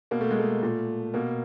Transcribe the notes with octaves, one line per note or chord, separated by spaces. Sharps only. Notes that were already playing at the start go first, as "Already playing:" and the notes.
B2 A#3
A3
G#3
A3
A#2
B2 A#3